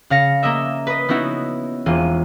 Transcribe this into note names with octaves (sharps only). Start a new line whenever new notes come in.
C#3 F5 A#6 C#7
A#3 A#4 D#5 E5
B4 D#5
B3 C#4 D#4 E4 F#4
E1 E3 A#3 F4 D#7